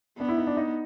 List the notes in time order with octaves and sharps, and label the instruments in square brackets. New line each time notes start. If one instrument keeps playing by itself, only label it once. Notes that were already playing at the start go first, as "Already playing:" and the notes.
[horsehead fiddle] B3 [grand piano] D4
[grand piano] E4
D#4
D4
D#4